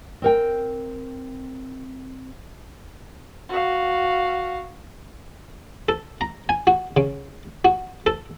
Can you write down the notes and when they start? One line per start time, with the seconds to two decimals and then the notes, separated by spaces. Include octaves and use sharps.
0.22 C4 A#4 G5
3.49 F#4 F5
5.89 A4
6.21 A#5
6.49 G#5
6.67 F#4
6.97 C#3
7.65 F#4
8.06 A4